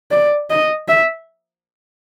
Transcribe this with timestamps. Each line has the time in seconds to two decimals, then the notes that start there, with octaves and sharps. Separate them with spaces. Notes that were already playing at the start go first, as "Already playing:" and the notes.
0.11 D5
0.50 D#5
0.88 E5